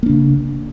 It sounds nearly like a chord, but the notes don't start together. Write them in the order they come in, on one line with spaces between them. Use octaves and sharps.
A#3 D4 C#3